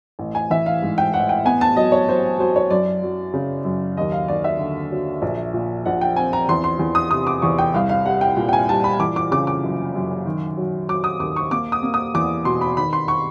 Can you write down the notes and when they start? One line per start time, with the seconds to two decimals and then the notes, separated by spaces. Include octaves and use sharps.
0.19 A1
0.35 G#5
0.50 E3 E5
0.66 F5
0.83 G#2
0.98 G5
1.14 A1 F#5
1.29 G5
1.45 B3 G#5
1.61 A5
1.76 F#3 D#5
1.92 C#5
2.08 F#3 C5
2.39 F#3 C5
2.56 C#5
2.70 F#2 D5
3.03 F#3
3.34 C#3
3.65 F#2
3.97 D#2 D#5
4.12 F5
4.28 D#2 D5
4.44 E5
4.59 D3
4.92 F#3
5.22 A#1
5.54 A#2
5.86 A#1 F#5
6.01 G5
6.16 C4 G#5
6.33 A#5
6.49 E2 C6
6.64 C6
6.79 E2
6.95 D#6
7.11 C3 D#6
7.27 D6
7.42 E2 C#6
7.58 G5
7.74 C2 F5
7.89 F5
8.05 G3 F#5
8.21 G5
8.37 A#2
8.49 G5
8.53 G#5
8.69 G3 A5
8.84 B5
8.99 E3 D6
9.16 D6
9.31 C#3 D6
9.47 D6
9.63 F#2
9.95 F#2
10.25 D#3
10.57 F#3
10.89 F#3 D6
11.04 D#6
11.19 D#2 D6
11.36 C#6
11.51 A#3 D6
11.72 D#6
11.83 A#3
11.94 D#6
12.14 E2 D6
12.45 B2 C6
12.61 B5
12.77 D#3 B5
12.93 C6
13.08 C#6